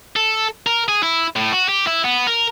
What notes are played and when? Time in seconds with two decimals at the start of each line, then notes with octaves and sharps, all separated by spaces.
0.16 A4
0.66 A#4
0.88 G#4
1.03 E4
1.36 A2
1.52 F#4
1.69 G4
1.87 E4
2.04 B3
2.27 A#4